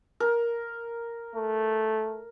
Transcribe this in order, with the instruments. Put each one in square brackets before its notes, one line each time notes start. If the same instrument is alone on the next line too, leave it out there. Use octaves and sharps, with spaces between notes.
[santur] A#4
[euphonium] A3